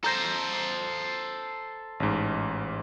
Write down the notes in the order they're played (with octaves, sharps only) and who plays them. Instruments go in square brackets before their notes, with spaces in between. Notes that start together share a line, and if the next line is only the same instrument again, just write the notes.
[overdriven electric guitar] A4 C5 [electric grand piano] A#5 G6 A#6
[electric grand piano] A1 G#2